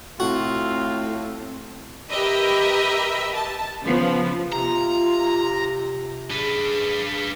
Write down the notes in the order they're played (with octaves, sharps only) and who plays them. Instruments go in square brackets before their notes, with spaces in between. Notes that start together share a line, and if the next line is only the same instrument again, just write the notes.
[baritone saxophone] A2 [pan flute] C4 [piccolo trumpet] F4 [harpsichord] F#4
[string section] G4 A#4 B4 D#5 E5
A5
C#3 F3 B3
[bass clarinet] C3 [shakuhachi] F4 [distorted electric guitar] A#5
[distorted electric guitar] D4 B4 [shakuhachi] G#4